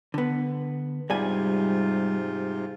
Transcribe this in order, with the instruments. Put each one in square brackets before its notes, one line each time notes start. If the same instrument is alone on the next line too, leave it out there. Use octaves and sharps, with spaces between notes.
[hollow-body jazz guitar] D3 B3
[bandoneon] G#2 C3 F4 [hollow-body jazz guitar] G3 G4 G#5